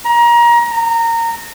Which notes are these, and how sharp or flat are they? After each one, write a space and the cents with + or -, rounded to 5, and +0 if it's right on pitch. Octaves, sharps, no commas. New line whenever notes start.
A#5 +25
A#5 -20